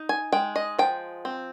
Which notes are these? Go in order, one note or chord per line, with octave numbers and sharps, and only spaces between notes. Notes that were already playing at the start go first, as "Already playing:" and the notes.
Already playing: D#4
G#5
G#3 G5
D#5
F3 G5
C4